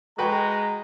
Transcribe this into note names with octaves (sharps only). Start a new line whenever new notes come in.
G#3 F#4 B4 G5 A#5